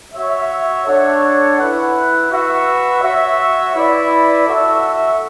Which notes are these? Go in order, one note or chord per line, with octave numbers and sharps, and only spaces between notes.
F#4 C#5 E5
D4 A4 C#5 F#5
E4 B4 F#5
F#4 B4 E5
F#4 C#5 E5
E4 B4 D5
F#4 A4 E5